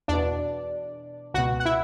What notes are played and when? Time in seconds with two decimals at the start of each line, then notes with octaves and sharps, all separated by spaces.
0.08 E2 B2 D4 D5
1.34 C#2 B2 F#4 F#5
1.60 F#5
1.66 E4 E5